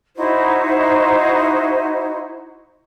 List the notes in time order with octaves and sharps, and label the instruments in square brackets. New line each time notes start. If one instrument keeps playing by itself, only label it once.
[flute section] D#4 E4 F#4 C5